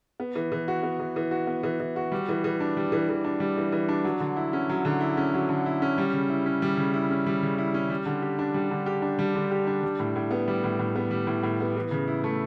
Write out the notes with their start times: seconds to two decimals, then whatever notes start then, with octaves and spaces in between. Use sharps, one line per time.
0.20 B3
0.35 E3
0.52 E3
0.68 F#4
0.83 B3
1.00 E3
1.16 E3
1.31 F#4
1.47 B3
1.63 E3
1.80 E3
1.96 F#4
2.12 G3
2.29 E3
2.44 E3
2.60 D4
2.77 G3
2.92 E3
3.09 E3
3.24 D4
3.40 G3
3.57 E3
3.72 E3
3.89 D4
4.04 F#3
4.20 D3
4.37 E4
4.53 C#4
4.69 F#3
4.85 D3
5.00 E4
5.17 C#4
5.34 F#3
5.49 D3
5.66 E4
5.82 C#4
5.98 G3
6.13 C#3
6.29 E4
6.46 C#4
6.62 G3
6.77 C#3
6.94 E4
7.10 C#4
7.27 G3
7.43 C#3
7.58 E4
7.74 C#4
7.90 G3
8.06 D3
8.22 G4
8.39 D4
8.54 G3
8.71 D3
8.86 G4
9.02 D4
9.19 G3
9.35 D3
9.51 G4
9.67 D4
9.83 G3
10.00 A2
10.16 A2
10.31 B3
10.48 G3
10.64 A2
10.79 A2
10.96 B3
11.11 G3
11.27 A2
11.43 A2
11.60 B3
11.76 E3
11.91 C#3
12.08 E4
12.24 A3